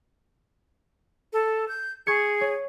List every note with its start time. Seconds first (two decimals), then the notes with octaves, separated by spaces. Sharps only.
1.33 A4
1.68 G6
2.07 G#4 C#6 G#6 C#7
2.41 C#5